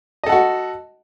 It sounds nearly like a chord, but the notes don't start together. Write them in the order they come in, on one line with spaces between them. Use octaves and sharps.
D#5 A4 F#5 F#4